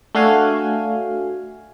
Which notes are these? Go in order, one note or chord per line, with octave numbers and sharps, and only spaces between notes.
A3 D4 F#4 F5 G#5